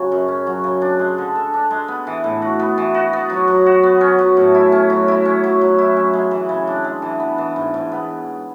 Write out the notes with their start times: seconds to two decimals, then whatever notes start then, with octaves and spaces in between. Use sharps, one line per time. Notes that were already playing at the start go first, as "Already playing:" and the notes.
Already playing: C#3 F#3
0.12 F#2
0.28 C#4
0.47 F#3
0.64 C#3
0.82 D4
0.99 G#3
1.18 D3
1.36 A4
1.54 D4
1.71 G#3
1.88 B3
2.07 E3
2.24 A2
2.42 F#4
2.60 B3
2.78 E3
2.94 F#4
3.13 B3
3.30 F#3
3.48 F#3
3.66 F#4
3.83 B3
4.01 C#4
4.19 F#3
4.37 A2
4.55 E4
4.72 C#4
4.90 F#3
5.08 E4
5.25 C#4
5.44 F#3
5.61 F#3
5.79 E4
5.97 C#4
6.13 G#3
6.31 E3
6.49 C#3
6.67 D4
6.85 G#3
7.02 E3
7.20 B3
7.38 E3
7.56 G#2
7.74 G#2
7.92 B3